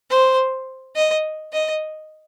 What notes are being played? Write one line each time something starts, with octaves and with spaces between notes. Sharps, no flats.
C5
D#5
D#5